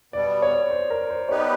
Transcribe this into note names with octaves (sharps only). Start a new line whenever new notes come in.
B2 G3 B3 D5
C#5
C5
A#4
C5
G3 B3 D#4 G4 B4 C#5